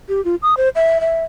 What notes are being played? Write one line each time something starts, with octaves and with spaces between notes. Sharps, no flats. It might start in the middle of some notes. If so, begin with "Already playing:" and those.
G4
F4
D#6
C5
E5
E5